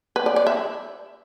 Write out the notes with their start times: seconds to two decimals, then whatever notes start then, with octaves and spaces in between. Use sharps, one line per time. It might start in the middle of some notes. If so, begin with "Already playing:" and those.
0.16 B4
0.26 D5
0.36 D5
0.47 E5